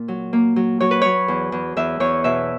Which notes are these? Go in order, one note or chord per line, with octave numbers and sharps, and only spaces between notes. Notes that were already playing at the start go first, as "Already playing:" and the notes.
Already playing: A#2 A#3
F#3
A#3
F#3
F#3 C#5
B4
F#3 C#5
E2
E2
E2 E5
E2 C#5
B2 E5